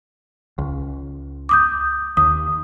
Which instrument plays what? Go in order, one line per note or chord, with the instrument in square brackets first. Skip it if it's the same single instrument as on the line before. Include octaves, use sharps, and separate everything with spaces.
[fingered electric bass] C#2
[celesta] D6 D#6 G6
[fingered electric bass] D#2 [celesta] D#6